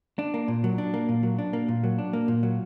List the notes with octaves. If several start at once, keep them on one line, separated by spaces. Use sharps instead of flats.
D4
A#3
A#2
F#3
D4
A#3
A#2
F#3
D4
A#3
A#2
F#3
D4
A#3
A#2
F#3